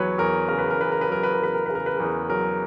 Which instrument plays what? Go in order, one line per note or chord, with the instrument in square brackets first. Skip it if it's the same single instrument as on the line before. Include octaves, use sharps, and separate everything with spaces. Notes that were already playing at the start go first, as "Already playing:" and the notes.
Already playing: [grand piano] E2 F#3 B4 C#5
E2 A#4
C#3 A#4
B4
A#4
E2 B4
A#4
B4
F#3 A#4
B4
A#4
E2 B4
A#4
C#3 B4
A#4
B4
E2 A#4
F#3 A#4